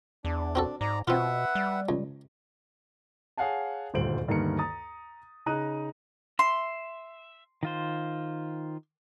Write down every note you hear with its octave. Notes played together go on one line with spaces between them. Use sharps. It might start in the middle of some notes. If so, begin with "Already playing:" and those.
E2 D4
C4 F#4 A4
G#2 D5 A#5
B2 C4 F4 B4 E5 F#5
G3
C#2
G#4 C#5 F5 F#5 G#5 A5
D#1 D2 G2 C5 D7 F#7
D2 G2 D#3 A#3 A#5 C#7
A#5 D#6 A6
C#3 D#4 A#5 D#6 F#6 D#7
E5 C6
D#3 F4 C5